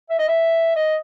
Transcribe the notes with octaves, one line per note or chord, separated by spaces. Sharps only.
E5
D#5
E5
D#5